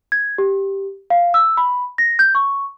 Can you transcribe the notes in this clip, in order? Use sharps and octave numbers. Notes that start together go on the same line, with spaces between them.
G#6
G4
F5
E6
B5
A#6
G6
C#6